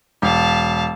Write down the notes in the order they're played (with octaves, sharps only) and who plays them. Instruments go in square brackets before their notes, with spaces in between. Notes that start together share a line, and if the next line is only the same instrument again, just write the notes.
[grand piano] E1 [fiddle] F5 A5